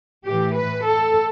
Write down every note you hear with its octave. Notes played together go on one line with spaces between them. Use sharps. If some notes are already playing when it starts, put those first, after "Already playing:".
A2 E3 G4
B4
A4